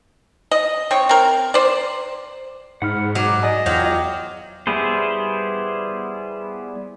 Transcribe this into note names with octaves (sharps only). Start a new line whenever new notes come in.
D#5
C4 C#5
C4 A#4
C5 D5
G#2 F#5 B5 F6
F#3 D#4 D6
D5 D#5 G#5
E2 F#3 F4 G5 D6 G6
G3 B3 E4 G#4 C5